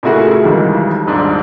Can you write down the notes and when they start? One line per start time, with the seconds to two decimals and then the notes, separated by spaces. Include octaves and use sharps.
0.03 A#2 C#3 A3 E4 F#4 G#4
0.43 B1 F2 D#3 E3 G3 G#3
1.07 D#1 G#2 D4